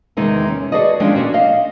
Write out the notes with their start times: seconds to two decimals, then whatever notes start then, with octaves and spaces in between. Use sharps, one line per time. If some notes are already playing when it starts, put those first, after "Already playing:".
0.17 E2 C3 D#3 G#3 C4 D#4
0.48 C#4
0.72 F#4 G#4 A4 B4 D5 D#5
1.00 D#2 F3 G#3 C#4 D4 G5
1.15 C#4 F#4 G4 C5 D5
1.34 D#5 F5